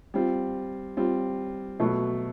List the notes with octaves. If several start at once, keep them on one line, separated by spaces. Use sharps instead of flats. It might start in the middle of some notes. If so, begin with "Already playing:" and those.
G3 C4 F4
G3 C4 F4
B2 F#3 A3